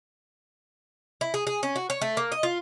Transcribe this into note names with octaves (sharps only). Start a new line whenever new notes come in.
E4
G#4
G#4
C#4
F#4
C#5
A3
A#3
D#5
F4